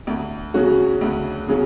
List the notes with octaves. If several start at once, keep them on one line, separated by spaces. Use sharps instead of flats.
D2
C#3 F#3 C#4 F#4
D2
C#3 F#3 C#4